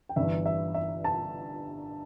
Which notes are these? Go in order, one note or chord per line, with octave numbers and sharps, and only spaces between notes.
G5
G1 G2 E3 E5
E5
E5
A5